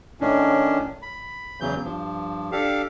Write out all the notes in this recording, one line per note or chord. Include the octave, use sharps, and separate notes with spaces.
A2 D#3 C#4 D4
B5
E2 C#3 E3 F#3 G6
G2 F3
D4 G4 A4 F5